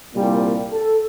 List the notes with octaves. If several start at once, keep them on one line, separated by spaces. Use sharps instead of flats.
C2 A#2 G3
A4